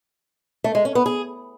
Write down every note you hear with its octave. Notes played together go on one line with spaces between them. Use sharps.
A3
G#3
C#4
B3
G#4